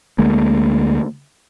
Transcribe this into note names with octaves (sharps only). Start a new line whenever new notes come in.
D2 D3 G#3 A#3